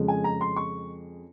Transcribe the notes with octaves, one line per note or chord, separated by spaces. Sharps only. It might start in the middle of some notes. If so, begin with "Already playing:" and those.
Already playing: F2 C#3 G#3
G#5
A#5
C6
C#6